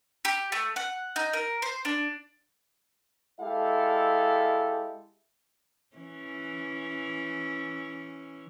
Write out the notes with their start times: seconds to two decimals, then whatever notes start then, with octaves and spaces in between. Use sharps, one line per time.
0.25 G4
0.52 A3
0.76 F#5
1.16 D#4
1.33 A#4
1.62 C5
1.85 D4
3.40 G#3 E4 G4 A4 E5 F5
5.96 E3 C#4